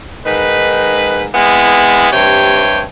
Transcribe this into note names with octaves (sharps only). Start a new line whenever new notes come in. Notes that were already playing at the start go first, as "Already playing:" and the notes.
G#2 D#3 B4
G#3 B3 C4 E4
G2 C3 C#5 G5